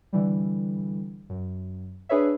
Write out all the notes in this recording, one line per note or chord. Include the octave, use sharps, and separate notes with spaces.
D3 E3 G3
F#2
D4 G#4 B4 C#5 E5